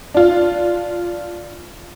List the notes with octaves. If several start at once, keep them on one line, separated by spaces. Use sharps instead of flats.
D4 F4